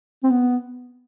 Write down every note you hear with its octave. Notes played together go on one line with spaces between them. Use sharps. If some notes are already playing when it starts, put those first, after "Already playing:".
C4
B3